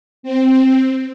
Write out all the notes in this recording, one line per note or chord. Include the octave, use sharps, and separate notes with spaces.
C4